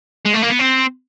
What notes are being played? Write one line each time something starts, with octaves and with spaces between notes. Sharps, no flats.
G#3
A3
A#3
B3
C4